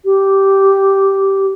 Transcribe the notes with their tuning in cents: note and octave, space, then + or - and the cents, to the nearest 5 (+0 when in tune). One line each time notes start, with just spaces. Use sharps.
G4 -10